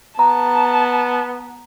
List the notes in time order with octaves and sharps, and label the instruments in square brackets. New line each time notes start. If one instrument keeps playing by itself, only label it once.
[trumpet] B3 [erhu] A5 [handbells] A#5